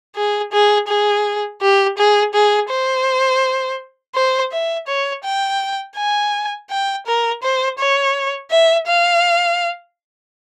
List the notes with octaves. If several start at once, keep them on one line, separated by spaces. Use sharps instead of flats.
G#4
G#4
G#4
G4
G#4
G#4
C5
C5
E5
C#5
G5
G#5
G5
A#4
C5
C#5
E5
F5